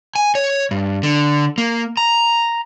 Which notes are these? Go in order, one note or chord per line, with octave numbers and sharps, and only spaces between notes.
G#5
C#5
G2
D3
A#3
A#5